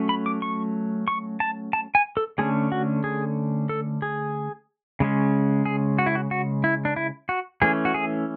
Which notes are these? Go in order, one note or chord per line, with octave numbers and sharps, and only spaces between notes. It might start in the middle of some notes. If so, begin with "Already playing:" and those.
Already playing: F#3 A3 C#4
B5
D6
C#6
C#6
A5
A5
G#5
A4
D3 A3 C#4 G#4
F#4
G#4
A4
G#4
C#3 G#3 C#4
G#4
F#4
E4
F#4
F#4
E4
D4
E4
F#4
E3 A3 C#4 G#4
F#4
G#4